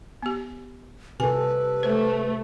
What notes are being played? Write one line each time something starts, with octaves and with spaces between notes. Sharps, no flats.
B3 G4
C3 A4 B4 G#5
A3 C5